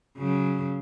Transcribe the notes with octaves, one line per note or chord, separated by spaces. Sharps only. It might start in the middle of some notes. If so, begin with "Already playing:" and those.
C#3 F#3